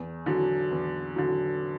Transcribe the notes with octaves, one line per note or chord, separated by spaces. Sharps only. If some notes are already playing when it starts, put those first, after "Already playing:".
Already playing: E2
D3 F#3
E2
D3 F#3